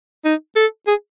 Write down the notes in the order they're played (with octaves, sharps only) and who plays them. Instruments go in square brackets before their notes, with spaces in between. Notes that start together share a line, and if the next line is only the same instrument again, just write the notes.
[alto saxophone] D#4
A4
G#4